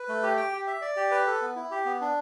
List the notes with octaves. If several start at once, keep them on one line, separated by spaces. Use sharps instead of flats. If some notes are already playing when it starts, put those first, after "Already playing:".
Already playing: B4
A3
G4
G5
G4
E5
D5
G4
B4
A4
B3
E4
G4
B3
D4